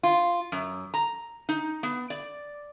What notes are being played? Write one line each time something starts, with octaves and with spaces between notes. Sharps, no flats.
F4
F#2
A#5
D#4
B3
D5